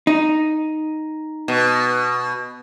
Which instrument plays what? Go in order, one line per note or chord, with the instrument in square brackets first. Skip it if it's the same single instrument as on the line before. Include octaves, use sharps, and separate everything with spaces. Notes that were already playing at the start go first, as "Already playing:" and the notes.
[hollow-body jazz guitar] D#4
[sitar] B2